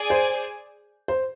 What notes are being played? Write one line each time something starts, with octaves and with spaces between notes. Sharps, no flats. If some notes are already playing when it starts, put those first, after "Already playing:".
Already playing: G#4 D5 G#5
C5
C5